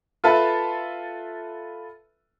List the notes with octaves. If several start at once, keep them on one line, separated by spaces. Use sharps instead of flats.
F4 A4 B4 E5 A5